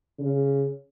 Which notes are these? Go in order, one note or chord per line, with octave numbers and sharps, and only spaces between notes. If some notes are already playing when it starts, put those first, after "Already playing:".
C#3